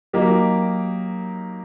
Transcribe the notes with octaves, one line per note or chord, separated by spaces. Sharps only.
F#3 A#3 D#4 G4 A#4